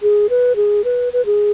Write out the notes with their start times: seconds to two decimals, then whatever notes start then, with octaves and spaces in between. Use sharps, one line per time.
0.02 G#4
0.30 B4
0.56 G#4
0.84 B4
1.13 B4
1.26 G#4